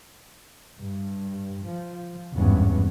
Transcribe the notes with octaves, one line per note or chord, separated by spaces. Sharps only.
G2
F3
G#1 E2 G2 E3 B3 C#4